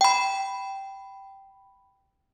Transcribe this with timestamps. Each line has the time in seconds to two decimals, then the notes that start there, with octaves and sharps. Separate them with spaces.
0.01 G5 B5